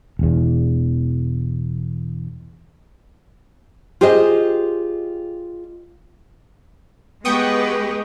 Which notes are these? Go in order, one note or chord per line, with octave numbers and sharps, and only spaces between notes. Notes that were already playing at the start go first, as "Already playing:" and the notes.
E1 E2
F4 G4 G#4 C5 D#5
G#3 B3 G4 B4 G5 C#6 D#6